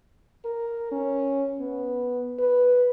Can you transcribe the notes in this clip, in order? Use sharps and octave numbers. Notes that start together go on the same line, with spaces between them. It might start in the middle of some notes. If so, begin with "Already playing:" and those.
A#4
C#4
B3
B4